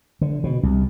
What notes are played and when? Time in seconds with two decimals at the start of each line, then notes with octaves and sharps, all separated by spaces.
0.21 D3
0.44 B2
0.63 C2